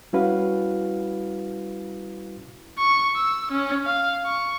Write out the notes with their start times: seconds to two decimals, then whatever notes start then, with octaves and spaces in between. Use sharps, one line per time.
0.13 G3 C#4 E4 F#4 B4 F5
2.78 C#6
3.16 E6
3.52 C#4
3.85 F5
4.26 C#6